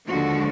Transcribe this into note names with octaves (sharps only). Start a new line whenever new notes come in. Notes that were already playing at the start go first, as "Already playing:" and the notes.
D#2 D3 F3 G#3 F#4